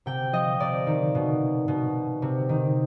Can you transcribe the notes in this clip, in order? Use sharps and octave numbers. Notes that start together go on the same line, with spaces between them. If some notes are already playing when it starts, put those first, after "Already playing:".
C3 G5
F3 D#5
C3 D5
D#3
B2
B2
C3
D#3